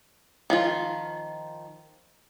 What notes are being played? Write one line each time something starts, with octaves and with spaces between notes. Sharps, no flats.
D#3 F3 F4